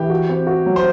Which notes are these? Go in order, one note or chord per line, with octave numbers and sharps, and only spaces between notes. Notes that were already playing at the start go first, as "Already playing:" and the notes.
Already playing: E3 G4
F#4
C4
F#4
F#3
C5